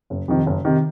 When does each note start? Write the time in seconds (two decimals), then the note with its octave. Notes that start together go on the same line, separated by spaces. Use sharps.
0.10 F#1
0.28 F2 C3 D#3
0.46 F#1
0.65 C3 D#3